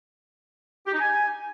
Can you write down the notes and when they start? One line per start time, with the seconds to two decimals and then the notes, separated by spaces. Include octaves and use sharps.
0.86 G4
0.93 D#4
1.00 G#5